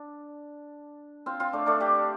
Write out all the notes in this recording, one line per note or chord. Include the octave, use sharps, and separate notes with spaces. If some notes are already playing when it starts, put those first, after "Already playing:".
Already playing: D4
C4 F4
C4 F4
A3 D4
A3 D4
D4 G4